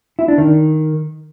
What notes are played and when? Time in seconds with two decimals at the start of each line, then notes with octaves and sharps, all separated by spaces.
0.19 E4
0.28 D4
0.38 D#3